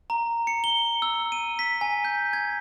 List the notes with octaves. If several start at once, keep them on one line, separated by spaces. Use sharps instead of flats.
A#5
C#7
G7
E6
D#7
B6
G#5
G6
G#6